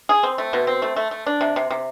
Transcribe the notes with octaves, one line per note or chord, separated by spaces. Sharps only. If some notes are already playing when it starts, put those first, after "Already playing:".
G#4
C4
A3
B2
C4
A3
A3
A3
D4
C3
C3
C3